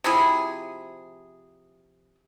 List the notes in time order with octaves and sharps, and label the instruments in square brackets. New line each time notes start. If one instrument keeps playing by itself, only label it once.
[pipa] C3 F3 E4 G#4